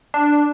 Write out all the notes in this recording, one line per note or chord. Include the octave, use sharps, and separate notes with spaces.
D4